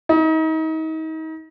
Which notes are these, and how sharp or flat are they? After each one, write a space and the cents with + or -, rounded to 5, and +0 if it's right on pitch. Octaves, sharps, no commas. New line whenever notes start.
D#4 +35